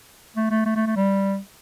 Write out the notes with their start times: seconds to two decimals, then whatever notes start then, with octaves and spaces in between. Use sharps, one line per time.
0.36 A3
0.51 A3
0.66 A3
0.76 A3
0.86 A3
0.96 G3